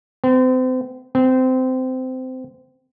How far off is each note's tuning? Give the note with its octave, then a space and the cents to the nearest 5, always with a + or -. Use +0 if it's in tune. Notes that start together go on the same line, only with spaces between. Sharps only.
C4 -35
C4 -20